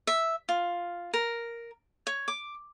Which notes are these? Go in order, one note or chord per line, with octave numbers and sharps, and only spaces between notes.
E5
F4
A#4
C#5
D6